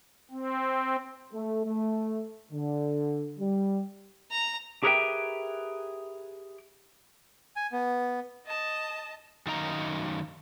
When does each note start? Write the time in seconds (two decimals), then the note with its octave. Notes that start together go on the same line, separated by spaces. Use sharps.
0.31 C4
1.33 A3
1.65 A3
2.52 D3
3.38 G3
4.31 A#5
4.83 G4 G#4 A#4 B4 E5 G5
7.56 G#5
7.72 B3
8.46 D#5 A5
9.47 F#2 D#3 D#4 F5 A#5